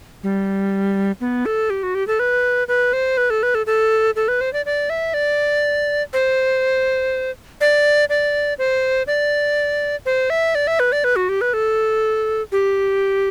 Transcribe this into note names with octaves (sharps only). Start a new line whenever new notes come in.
G3
B3
A4
G4
F#4
G4
A4
B4
B4
C5
B4
A4
B4
A4
A4
A4
B4
C5
D5
D5
E5
D5
C5
D5
D5
C5
D5
C5
E5
D5
E5
B4
D5
B4
F#4
G4
B4
A4
G4